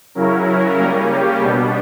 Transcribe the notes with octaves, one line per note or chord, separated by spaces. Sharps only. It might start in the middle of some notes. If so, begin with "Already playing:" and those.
C#3 F#3 C#4 E4 A#4
C#3 G3 A#3 C#4 A#4
G4
B2 G3 B3 D4